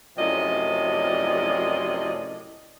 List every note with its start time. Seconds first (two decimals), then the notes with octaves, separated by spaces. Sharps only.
0.17 F#2 A2 C3 F3 D5 D#5